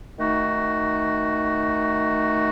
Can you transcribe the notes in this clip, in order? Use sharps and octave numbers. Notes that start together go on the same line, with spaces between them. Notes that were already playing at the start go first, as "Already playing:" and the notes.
D#3 A3 D#4 F#4